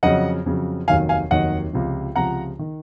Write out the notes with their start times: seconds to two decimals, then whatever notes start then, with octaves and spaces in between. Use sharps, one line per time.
0.03 F2 C#3 F#3 D#5 F#5
0.46 F2 C#3 F#3
0.88 F1 D#2 D#3 F#3 F5 G#5
1.09 F5 G#5
1.30 F1 D#2 D#3 F#3 D#5 F#5
1.73 C#2 C3 F3
2.16 C#2 C3 F3 F#5 A#5
2.59 D#3